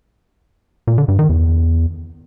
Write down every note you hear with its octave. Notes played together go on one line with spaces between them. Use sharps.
A#2
D3
G2
D#3
E2